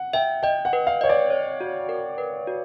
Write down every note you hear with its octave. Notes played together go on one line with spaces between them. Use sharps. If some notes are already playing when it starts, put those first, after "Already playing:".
Already playing: F#5
E5 G5
D#5 G5
F#5
B4
F5
C#5 D#5
D5
C#5
F#4
A#4
B4
F#4